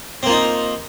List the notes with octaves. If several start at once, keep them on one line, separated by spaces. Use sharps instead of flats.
A#3 C4 D#4 F4